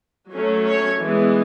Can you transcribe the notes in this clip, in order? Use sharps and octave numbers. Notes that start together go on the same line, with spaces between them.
F#3 A3 C#4
C#5
E3 G#3 B3